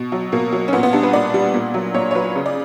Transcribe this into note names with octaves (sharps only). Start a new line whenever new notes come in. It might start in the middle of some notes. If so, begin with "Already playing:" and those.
Already playing: B2
F#3
B2 A#3
F#3
C#4
A#2 B3
B3
G3 D4
B4
A#2 D5
G3
A#2
F#3
A#2 C#5
C#5
F#3 B4
C#3
D5